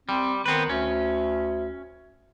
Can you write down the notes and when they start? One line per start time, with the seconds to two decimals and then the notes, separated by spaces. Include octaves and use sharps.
0.09 G3 C4
0.46 D#3 B3 C4 B4
0.70 D2 C#4